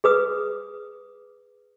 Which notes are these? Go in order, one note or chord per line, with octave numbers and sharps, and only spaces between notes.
G#4 B4 D#6